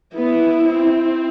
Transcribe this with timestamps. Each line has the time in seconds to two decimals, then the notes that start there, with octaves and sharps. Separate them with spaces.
0.15 B3 E4
0.63 C4